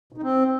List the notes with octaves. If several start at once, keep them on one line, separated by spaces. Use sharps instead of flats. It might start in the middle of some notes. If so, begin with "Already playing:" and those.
B2
D#4
C4